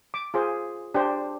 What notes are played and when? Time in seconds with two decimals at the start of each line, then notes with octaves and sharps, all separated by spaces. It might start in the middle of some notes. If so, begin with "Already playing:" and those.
0.14 D6
0.34 F4 G#4 C5
0.94 D4 G4 C5